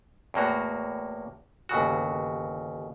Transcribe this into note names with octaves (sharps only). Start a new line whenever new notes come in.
E2 A2 A#3 F#4
G1 D#2 C#3 F#4